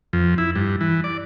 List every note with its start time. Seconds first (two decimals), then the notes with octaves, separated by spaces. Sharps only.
0.13 F2
0.38 E4
0.56 G2
0.81 E3
1.04 D5